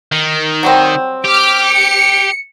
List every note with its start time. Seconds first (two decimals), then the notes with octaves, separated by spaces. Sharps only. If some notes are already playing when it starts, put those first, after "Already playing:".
0.12 D#3
0.63 F#3 G3 C4
1.25 G4 D6 F6
1.66 C#7